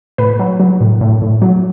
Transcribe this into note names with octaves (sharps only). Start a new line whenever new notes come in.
A2 B4
F#3
F#3
A2
A2
A2
F#3